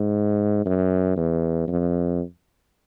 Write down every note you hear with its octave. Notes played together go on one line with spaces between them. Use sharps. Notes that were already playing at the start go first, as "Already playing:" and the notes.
Already playing: G#2
F#2
E2
F2